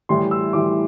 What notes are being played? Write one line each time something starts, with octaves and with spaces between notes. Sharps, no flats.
A2 E3 G3 C6
E6
A2 E3 G3 D6